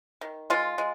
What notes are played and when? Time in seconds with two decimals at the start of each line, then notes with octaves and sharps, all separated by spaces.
0.21 D#3
0.50 G#3 F4
0.78 G#3